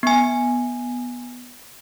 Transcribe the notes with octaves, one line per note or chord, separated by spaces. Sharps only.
B3 G#5